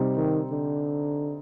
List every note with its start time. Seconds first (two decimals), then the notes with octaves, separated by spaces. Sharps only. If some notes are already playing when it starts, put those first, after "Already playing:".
Already playing: C3 G3 C4 D#4
0.17 D#3
0.50 D3